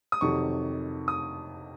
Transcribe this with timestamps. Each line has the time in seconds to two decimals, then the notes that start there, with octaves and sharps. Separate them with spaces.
0.12 D#6
0.21 F2 C3 D#3 F#3 C#6
1.08 D#6